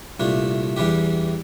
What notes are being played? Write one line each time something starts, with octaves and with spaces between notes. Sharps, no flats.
C2 A#2 A3 D4
E2 E3 G3 D4 G4